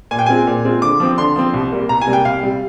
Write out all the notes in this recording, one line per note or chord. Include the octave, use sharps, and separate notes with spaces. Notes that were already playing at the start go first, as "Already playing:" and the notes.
A#2 G#5
G5
G#3 C4 F4 G#5
A#2
G#3 C4 F4
D3 D6
F3 C4
D3 C6
F3 C4
C2
C3 G3 A#3
C2 A#5
G#5
C3 G3 A#3
G5
C2 F5
C3 G3